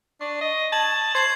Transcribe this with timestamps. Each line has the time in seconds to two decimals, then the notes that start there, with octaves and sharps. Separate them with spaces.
0.21 D4 C#6
0.41 D#5
0.72 A5 G#6 F#7
1.15 C5 G#6 C7 F#7